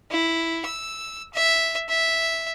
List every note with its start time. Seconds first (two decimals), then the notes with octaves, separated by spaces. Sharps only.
0.11 E4
0.66 E6
1.34 E5
1.89 E5